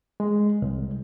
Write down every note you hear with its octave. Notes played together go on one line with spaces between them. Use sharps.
G#3
C2